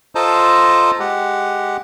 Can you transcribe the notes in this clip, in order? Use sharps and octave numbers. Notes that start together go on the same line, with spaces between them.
F4 A4 C5 D#5 A5 A#5
G#3 G4 F#5